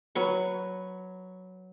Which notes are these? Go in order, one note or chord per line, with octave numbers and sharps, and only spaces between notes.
F#3 B4 C#6